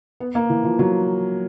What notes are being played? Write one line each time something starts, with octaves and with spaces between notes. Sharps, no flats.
B3
A#3
E3
F3
F#3